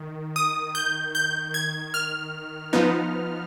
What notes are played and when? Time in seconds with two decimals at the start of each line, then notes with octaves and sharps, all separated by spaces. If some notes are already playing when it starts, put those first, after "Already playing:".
Already playing: D#3
0.36 D#6
0.75 G6
1.15 G6
1.54 G#6
1.94 F6
2.73 F3 B3 D#4